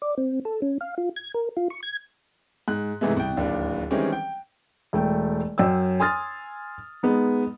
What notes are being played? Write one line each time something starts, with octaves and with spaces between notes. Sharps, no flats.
D5
C4
A4
C#4
F5
F4
G#6
A#4
F4
C#6
G#6
G#2 F#6
G#2 C3 E3 G#3 A3
C2 G5
D1 D#2 D4
D#3 E3 G3 G#3 C4 C#4
G5
E1 A3 G5
F#2 C#4 G5 E6
G#5 C6 D#6 F6 A6
G#3 B3 D#4